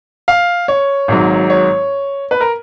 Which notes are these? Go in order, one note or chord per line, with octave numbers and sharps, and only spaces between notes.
F5
C#5
G#1 G#2 F#3
C#5
B4
A#4